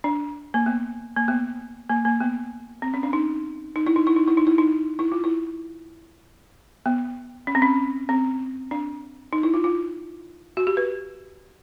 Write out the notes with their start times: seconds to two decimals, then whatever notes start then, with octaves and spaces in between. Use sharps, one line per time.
0.04 D4
0.54 A#3
0.66 B3
1.17 A#3
1.28 B3
1.89 A#3
2.05 A#3
2.20 B3
2.82 C4
2.94 C#4
3.03 D4
3.13 D#4
3.76 D#4
3.87 E4
3.96 D#4
4.07 E4
4.16 D#4
4.28 E4
4.37 D#4
4.47 E4
4.58 D#4
4.99 E4
5.12 F4
5.24 E4
6.86 B3
7.47 C#4
7.55 C4
7.62 C#4
8.09 C4
8.71 D4
9.33 D#4
9.43 E4
9.54 F4
9.64 F4
10.57 F#4
10.67 G4
10.77 B4